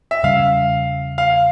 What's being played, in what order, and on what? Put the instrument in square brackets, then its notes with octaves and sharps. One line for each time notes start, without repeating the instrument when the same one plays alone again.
[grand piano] E5
[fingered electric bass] E2 C#3 G3 C#4 [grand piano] F5
[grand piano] F5